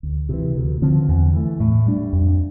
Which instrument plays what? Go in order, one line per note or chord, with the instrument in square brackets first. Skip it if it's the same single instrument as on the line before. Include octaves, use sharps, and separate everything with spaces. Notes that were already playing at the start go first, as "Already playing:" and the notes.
[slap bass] D2
C3 E3
D2
D3 F3 C4
E2
E3 A3
A2
G3 D4
F2